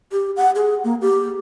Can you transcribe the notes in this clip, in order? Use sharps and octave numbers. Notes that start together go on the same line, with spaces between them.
G4
F#5
G#4
A#3
G4